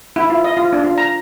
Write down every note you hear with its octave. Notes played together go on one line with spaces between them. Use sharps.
E4
F4
D#5
F4
D4
F4
A#5